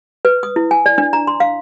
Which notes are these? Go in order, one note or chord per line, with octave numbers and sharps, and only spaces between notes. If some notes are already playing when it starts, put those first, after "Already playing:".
B4
D#6
E4
G#5
D5
D4
A#5
C6
F5